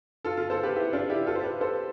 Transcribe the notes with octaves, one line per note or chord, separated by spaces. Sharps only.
F4 A4
F4 A4
A4 C5
G4 B4
E4 G4
D4 F4
E4 G4
F4 A4
C5
G4 B4
A4 C5